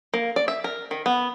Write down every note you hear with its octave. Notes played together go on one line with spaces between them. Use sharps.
A#3
D5
E5
A#4
D#3
B3